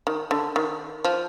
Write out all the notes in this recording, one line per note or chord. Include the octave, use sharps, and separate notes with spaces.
D#3
D3
D#3
F3